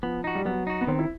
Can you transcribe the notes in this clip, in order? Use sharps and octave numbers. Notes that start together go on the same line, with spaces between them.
F3 B3
D#4 F#4
G3
F#3 B3
D#4 F#4
B3
D#3 C4
E4